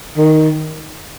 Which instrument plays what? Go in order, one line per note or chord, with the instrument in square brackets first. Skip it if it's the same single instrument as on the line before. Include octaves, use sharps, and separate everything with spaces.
[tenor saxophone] D#3